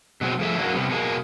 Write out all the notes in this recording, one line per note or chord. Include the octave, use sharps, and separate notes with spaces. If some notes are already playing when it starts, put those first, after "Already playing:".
B2 F#3 G#3 C4
F3 A3 G#4 E5
E3 F#3 G#3 A#3 C#4 F#4
C3 G3 B3
B2 G#3 A#3 G#4